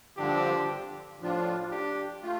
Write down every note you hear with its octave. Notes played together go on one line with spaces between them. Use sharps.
G2 D3 F3 C4 D4 G4
A2 F3 D4 F4
D4 G4
A3 F4